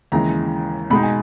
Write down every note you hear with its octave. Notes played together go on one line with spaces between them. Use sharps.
D#2 C#3 E3 G#3 A#5
B2 G#3 D#4 B5
G#5